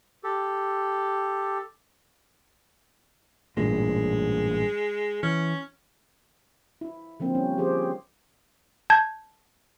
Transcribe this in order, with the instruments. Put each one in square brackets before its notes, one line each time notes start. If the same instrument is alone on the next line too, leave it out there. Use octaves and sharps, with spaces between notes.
[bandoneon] G4 A4
[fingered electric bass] A1 G2 A#2 [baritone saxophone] G#3
[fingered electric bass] E3 [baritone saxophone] C#4
[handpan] E4
D3 F3 A#3 C4
G3 C#4
F3 G4 G#4 C5
[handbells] A5 G6 G#6